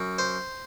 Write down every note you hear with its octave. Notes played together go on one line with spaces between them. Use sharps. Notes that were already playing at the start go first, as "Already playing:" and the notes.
Already playing: F#2
C5